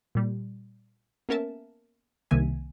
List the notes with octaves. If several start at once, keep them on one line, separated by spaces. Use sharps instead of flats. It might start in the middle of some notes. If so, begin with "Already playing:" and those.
A#2 G3
A#3 B3 C#4 A#4 E5 A5
C2 C3 D#3 A#3 E5 G#5